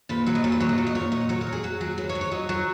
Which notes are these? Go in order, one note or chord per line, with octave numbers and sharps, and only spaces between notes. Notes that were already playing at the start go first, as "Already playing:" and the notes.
A#2 B4
F#3 C#5
D#5
A#2 C#5
B4
F#3 C#5
D#5
A#2 C#5
D#5
A#2 C#5
F#3 D#5
F#3 C#5
A#4
F#3
G#4
F#3 F#4
F#3 G#4
F#3 B4
C#5
F#3
C#5
F#3 D#5
F#3 C#5